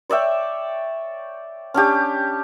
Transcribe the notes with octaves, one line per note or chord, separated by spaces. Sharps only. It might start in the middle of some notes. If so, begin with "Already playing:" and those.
C#5 D5 E5 G5
C#4 D4 G4